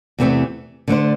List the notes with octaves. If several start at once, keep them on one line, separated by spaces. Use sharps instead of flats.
E2 C3 E3 A3 C4
D3 A3 D4 C5